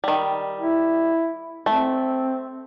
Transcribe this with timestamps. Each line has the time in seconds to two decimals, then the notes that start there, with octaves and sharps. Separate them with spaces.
0.04 D#3 G3
0.59 E4
1.66 A3 C4